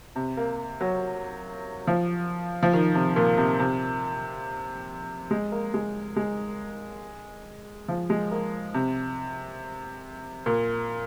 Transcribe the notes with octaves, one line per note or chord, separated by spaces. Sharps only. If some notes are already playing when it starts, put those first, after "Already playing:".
C3
A#3
F#3
F3
F3
D#3
C3
A#2
C3
C3
G#3
A#3
G#3
G#3
F3
G#3
A#3
C3
A#2